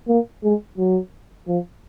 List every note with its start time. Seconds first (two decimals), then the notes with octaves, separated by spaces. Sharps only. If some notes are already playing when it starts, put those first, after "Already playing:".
0.08 A#3
0.44 G#3
0.78 F#3
1.48 F3